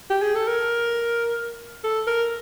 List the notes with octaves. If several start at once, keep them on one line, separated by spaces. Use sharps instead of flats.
G4
G#4
A4
A#4
A4
A#4